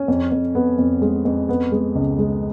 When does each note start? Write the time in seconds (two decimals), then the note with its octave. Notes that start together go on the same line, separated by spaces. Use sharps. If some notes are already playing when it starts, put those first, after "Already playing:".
Already playing: C#4
0.08 F2
0.31 F2
0.55 B3
0.78 F2
1.02 G#3
1.25 F2
1.49 B3
1.72 G#3
1.95 C#2
2.19 G#3